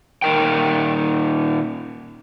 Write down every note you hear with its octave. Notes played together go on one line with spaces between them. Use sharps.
A#2 D#3 A#4 G5